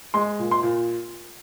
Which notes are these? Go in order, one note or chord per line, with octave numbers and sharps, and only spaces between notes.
G#3 C6
A#2
C6
A#2